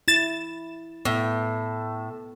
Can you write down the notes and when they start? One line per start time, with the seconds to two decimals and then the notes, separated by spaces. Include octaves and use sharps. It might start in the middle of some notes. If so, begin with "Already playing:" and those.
0.08 E4 A6 E7
1.05 A2 B3